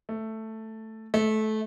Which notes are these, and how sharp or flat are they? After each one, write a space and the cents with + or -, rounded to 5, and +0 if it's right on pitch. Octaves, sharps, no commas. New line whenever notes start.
A3 +5
A3 -20